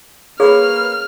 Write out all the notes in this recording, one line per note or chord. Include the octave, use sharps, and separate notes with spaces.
A#3 G#4 B4 C#5 F6